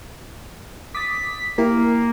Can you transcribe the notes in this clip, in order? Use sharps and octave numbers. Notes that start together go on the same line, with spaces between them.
D6 D#6 A6 B6
A#3 E4 G4 A#4